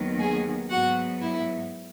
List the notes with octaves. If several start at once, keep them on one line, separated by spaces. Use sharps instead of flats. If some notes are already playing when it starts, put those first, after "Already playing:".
Already playing: D#2 D#3 F#3 B3
G#4 G#5
G#2 F#3 B3 F#4 F#5
E4 E5